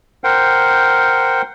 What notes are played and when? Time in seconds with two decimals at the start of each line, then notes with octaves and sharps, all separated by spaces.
0.24 A#4 C5 F#5 G5